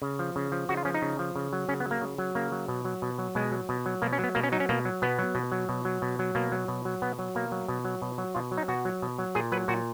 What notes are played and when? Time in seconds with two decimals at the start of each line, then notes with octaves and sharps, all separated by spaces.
0.02 C#3
0.19 F3
0.36 C#3
0.52 F3
0.69 C#3 F#4
0.77 F4
0.85 F3 C#4
0.94 D#4
1.02 C#3
1.19 F3
1.36 C#3
1.53 F#3
1.69 C#3 C#4
1.80 B3
1.86 F#3
1.91 A#3
2.02 C#3
2.18 F#3
2.35 C#3 A#3
2.52 F#3
2.68 B2
2.85 F#3
3.02 B2
3.19 F#3
3.35 B2 G#3
3.52 F#3
3.69 B2
3.86 F#3
4.02 B2 A#3
4.13 C#4
4.19 F#3 B3
4.35 B2 A#3
4.44 C#4
4.52 F#3 D#4
4.60 C#4
4.69 B2 A#3
4.85 F#3
5.02 B2 B3
5.19 F#3
5.35 B2
5.52 F#3
5.69 B2
5.85 F#3
6.02 B2
6.19 F#3
6.35 B2 A#3
6.52 F#3
6.68 B2
6.85 F#3
7.02 B2 B3
7.19 F#3
7.35 B2 A#3
7.52 F#3
7.68 B2
7.85 F#3
8.02 B2
8.18 F#3
8.35 B2 F4
8.51 F#3
8.58 D#4
8.68 B2 F#4
8.85 F#3
9.02 B2
9.19 F#3
9.35 A#2 G#4
9.52 F#3 B4
9.68 A#2 F#4